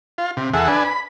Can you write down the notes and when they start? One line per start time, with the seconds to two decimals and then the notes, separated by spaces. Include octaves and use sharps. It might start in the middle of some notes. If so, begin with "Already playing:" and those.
0.18 F4
0.37 C3
0.53 E2 G#4 A4 E5 F#5
0.68 D4 B4 G#5
0.85 B5